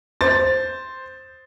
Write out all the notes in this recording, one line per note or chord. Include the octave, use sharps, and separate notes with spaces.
C5 A6